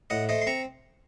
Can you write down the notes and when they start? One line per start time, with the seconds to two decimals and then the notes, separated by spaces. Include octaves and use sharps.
0.10 A2 D#5 F#5
0.29 A3 C5 D#5
0.42 C6
0.47 C4 A#5 C#6